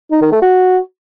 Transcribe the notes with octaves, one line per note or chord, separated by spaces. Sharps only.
D#4
D#3
A3
F#4